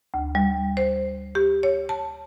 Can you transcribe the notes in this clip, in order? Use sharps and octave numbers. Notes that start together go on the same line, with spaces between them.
D2
G3
C5
G4
C#5
A5